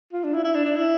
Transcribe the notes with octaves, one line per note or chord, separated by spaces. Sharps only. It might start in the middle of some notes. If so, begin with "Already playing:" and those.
F4
D4
E4
E4
D4
D4
E4